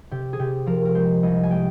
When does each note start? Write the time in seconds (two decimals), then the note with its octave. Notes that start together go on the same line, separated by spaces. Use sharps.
0.11 C3 G4
0.33 G#4
0.39 C3 G4
0.66 F3 A#4
0.85 A#4
0.95 G#3 C5
1.23 C2 D#5
1.43 G#5
1.51 G#3 G5